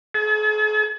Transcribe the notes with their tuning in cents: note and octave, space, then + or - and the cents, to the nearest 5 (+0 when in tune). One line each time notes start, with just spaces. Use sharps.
G#4 +45